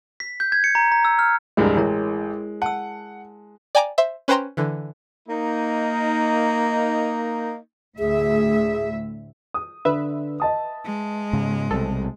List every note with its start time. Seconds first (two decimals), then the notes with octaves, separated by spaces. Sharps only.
0.20 B6
0.40 G6
0.52 G#6
0.64 C#7
0.75 A#5
0.92 A#5
1.05 E6
1.19 F6
1.57 F1 C2 G2 G#3 A#4
1.77 A1 E4 A#4 C#5
2.62 F#5 A5 E6
3.75 D5 G5 G#5 A#5 D6
3.98 C5 E5
4.28 C#4 B4 C5 G5 A#5 C6
4.57 D3 E3
5.29 A#3 D#4
7.99 D2 A2 G#4 E5
9.54 D#6
9.85 D3 B4 E5
10.40 D#5 A5 D#6
10.85 G#3
11.33 G#2 C#3
11.71 B1 C3 G3 A4